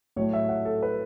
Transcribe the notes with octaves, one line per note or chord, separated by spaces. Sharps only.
A2 F#3 A3 C#5
E5
F#5
A4
B4